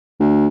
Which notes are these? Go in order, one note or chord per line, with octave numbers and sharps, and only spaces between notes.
D2